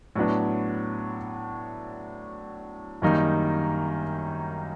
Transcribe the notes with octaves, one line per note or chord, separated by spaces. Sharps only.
A2 F#3 B3 D4
F#2 D#3 G3 A#3 D#4